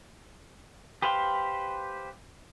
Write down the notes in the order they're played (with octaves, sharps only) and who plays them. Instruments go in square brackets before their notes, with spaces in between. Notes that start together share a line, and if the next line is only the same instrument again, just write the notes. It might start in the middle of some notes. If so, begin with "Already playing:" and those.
[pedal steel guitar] G4 B4 C5 F5 G5